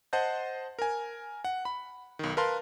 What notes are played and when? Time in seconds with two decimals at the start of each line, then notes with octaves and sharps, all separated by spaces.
0.13 C5 D#5 F#5 A5 G6
0.79 A#4 G#5
1.44 F#5
1.65 B5
2.19 B1 D#3
2.37 A#4 B4 F5 A5 C6